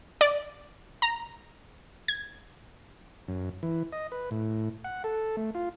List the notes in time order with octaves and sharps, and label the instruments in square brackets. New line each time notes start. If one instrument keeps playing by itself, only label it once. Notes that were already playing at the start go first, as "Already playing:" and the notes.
[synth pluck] D5
A#5
G#6
[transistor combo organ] F#2
E3
D#5
B4
A2
F#5
A4
A3
F4